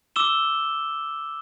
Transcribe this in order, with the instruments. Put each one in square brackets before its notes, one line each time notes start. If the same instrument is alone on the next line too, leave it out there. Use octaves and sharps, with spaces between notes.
[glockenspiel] D6 E6 E7 G7